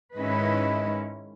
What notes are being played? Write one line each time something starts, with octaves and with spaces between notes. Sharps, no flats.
G#2 D#3 G#3 C#4 E4 B4 D#5